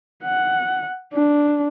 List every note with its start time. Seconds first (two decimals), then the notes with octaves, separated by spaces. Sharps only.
0.24 F#5
1.13 D4